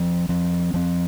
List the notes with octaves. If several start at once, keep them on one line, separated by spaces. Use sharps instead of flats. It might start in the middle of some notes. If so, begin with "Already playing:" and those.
Already playing: F3 C4
F3 C4
F3 C4